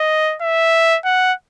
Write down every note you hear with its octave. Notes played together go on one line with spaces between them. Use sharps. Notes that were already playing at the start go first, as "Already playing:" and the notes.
Already playing: D#5
E5
F#5